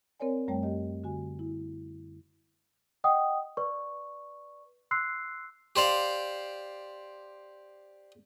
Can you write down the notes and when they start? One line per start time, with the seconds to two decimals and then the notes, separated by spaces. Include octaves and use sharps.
0.20 C4 A#4 C#5 D5 G#5
0.48 F#2 G3 A3 C#5 G5 A5
0.63 G4 D#5
1.04 D3 F#4 G#5
1.39 E4
3.04 D#5 F#5 G5 D#6
3.57 B4 D5 C#6
4.91 C6 E6 F#6 C7
5.76 G4 C5 D5 F5